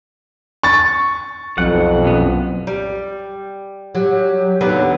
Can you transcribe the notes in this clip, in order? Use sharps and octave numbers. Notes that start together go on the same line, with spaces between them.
C#6 A6
B1 F2 F#5
C2 F#2 B3
G3
F#3 G4
D#2 D3 F#3 B3